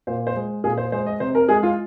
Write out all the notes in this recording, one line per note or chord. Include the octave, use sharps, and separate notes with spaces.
A#2 C5
C5
G#3
A#2 G#4
C5
G#3 C5
D#5
C3 C5
A#4
G#3 G#4
F4